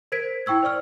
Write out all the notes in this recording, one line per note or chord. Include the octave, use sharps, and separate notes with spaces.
A#4 C5 G#6 B6 D7
E4 G5 C#6 E6 G#6
C5 D5 C#6 F6